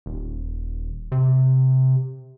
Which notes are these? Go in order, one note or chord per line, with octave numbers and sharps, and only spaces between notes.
D#1
C3